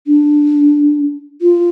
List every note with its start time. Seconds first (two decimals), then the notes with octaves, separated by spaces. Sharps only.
0.07 D4
1.42 F4